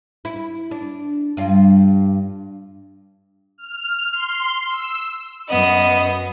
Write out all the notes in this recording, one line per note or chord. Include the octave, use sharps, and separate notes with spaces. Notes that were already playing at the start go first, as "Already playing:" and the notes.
E4
D4
G2 F4
F6
C6
E6
F#2 B3 D#5